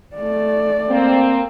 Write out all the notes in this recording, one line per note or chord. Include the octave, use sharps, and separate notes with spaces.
A3 D5
A#3 C4